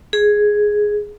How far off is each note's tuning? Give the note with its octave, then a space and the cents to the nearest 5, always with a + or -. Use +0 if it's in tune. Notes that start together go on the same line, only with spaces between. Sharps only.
G#4 +5